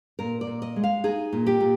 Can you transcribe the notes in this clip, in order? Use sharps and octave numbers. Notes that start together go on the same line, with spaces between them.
A#2 A#4
D5
A#2
D#5
G#3
F5
D#4 G#4
A#2
G4
A#2